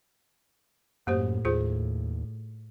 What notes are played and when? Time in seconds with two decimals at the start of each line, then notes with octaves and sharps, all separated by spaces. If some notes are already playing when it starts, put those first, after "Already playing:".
1.07 F#2 A2 A#3 G4 C5
1.45 D#2 F4 G#4 C5